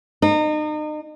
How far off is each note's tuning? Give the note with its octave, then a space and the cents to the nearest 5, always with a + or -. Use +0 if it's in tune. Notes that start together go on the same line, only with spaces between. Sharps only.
D#4 -35